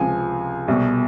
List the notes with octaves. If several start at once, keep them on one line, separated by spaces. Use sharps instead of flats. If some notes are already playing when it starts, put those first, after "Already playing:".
Already playing: C#2 C3 F3 G#5
C2 B2